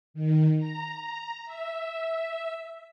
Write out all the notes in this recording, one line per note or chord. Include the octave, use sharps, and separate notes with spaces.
D#3
A#5
E5